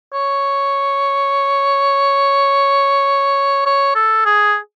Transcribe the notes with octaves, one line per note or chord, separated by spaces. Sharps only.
C#5
C#5
A4
G#4